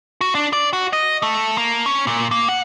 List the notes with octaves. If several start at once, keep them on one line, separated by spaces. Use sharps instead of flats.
F#4
D4
D5
F#4
D#5
A3
A#3
C#4
A#2
A#3
F#5